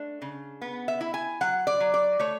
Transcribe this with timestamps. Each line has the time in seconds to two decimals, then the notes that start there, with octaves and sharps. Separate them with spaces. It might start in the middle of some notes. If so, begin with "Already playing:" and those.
Already playing: A3 D4
0.22 C#3
0.62 B3
0.88 E5
1.01 E4
1.14 G#5
1.41 F#3 F#5
1.67 D5
1.80 F#3
1.94 D5
2.19 A3 C#5